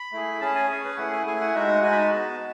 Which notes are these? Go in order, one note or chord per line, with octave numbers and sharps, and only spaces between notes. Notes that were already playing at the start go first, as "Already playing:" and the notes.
Already playing: B5
A3 E4 G#4
C#4 G#4 A5
G#5
C#4 G#4 C#5
B4
A3 E4 G#4 F#5
G#5
A3 E4 G#4 G#5
F#5
G#3 D#4 F#4 E5
F#5
G#3 D#4 F#4 G#5
B5
A5
B3 F#4